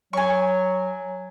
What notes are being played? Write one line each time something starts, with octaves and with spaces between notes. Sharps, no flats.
F#3 G#5 C#6